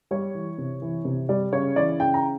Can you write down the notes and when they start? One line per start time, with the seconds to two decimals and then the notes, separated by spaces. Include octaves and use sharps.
0.11 G3 C#5
0.35 E3
0.58 C3
0.82 E3
1.05 C3
1.29 G3 D5
1.52 C#3 C#5
1.76 E3 D5
2.00 C#3 G5
2.14 A#5